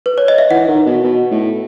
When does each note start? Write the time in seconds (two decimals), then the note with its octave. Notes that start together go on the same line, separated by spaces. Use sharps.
0.06 B4
0.18 C#5
0.28 D#5
0.38 E5
0.50 E3 F#5
0.68 D#3
0.86 B2
1.03 B2
1.31 A2